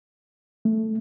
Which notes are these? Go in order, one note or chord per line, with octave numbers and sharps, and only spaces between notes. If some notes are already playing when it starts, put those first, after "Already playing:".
A3